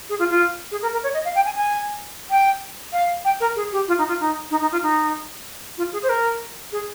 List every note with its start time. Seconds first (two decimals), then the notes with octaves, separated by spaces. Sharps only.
0.09 G#4
0.19 F4
0.29 F4
0.71 G#4
0.82 A#4
0.92 A#4
1.03 C#5
1.13 D#5
1.24 F5
1.35 G5
1.45 G#5
1.56 G#5
2.30 G5
2.92 F5
3.24 G5
3.40 A#4
3.55 G#4
3.72 G4
3.87 F4
3.98 D#4
4.08 F4
4.20 D#4
4.50 D#4
4.61 D#4
4.71 F4
4.82 D#4
5.77 F4
5.92 G#4
6.02 C5
6.09 A#4
6.72 G#4